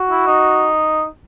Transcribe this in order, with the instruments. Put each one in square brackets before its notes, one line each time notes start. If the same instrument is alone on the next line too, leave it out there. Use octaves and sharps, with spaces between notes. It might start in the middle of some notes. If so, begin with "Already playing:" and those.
Already playing: [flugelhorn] F#4
[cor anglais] E4
D#4